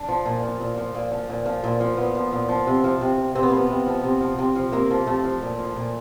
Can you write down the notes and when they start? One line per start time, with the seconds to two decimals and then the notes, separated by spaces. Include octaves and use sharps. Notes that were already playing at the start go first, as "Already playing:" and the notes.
Already playing: D4
0.09 F3
0.26 A#2
0.43 F3
0.60 A#2
0.77 F3
0.95 A#2
1.11 F3
1.29 A#2
1.46 F3
1.64 A#2
1.80 F3
1.97 A#2 B3
2.15 F3
2.32 A#2
2.49 F3
2.67 C3
2.84 F3
3.01 C3
3.18 F3
3.35 C3 C4
3.43 B3
3.50 F3 A#3
3.57 B3
3.70 C3
3.86 F3
4.04 C3
4.21 F3
4.39 C3
4.56 F3
4.72 C3 A#3
4.90 F3
5.07 C3 A3
5.24 F3
5.42 A#2
5.59 F3
5.76 A#2